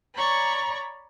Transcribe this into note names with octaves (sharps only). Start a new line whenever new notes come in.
C#5 D5 A#5 B5 C#6